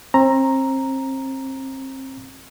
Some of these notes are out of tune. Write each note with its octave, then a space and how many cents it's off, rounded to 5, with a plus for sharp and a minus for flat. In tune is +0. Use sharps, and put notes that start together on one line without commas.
C4 +30 A#5 +0